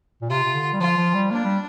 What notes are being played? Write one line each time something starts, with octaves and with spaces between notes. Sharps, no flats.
A#2
C3 F4
C3
D3
G3
F3 F4
F3
G3
A#3 D4
G3